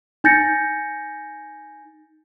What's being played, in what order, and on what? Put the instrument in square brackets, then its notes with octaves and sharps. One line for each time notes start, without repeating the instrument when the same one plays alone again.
[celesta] D#4 G#5 G6 A6 A#6 C#7